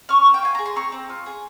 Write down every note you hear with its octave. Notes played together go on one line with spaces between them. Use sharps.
C#4 C#6 F6
A#3
G5
F4 G#5
G#4 A#5
C6
C4 A#5 C#6
C4
F4
G#4